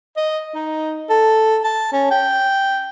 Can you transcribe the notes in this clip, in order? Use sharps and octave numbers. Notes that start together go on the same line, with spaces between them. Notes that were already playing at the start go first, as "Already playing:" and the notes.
D#5
D#4
A4
A5
C#4
G5